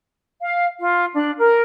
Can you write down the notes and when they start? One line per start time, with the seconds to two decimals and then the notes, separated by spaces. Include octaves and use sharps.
0.41 F5
0.80 F4
1.14 D4
1.39 A#4